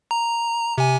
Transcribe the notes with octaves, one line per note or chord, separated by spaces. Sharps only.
A#5
C3 G#5